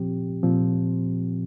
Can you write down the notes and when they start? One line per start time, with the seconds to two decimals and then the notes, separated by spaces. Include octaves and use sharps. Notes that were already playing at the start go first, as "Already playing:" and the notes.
Already playing: A#2 F3 C4 G4
0.43 A#2 F3 C4